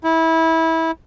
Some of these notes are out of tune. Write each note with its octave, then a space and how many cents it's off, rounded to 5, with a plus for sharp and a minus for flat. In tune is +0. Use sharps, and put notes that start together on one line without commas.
E4 -20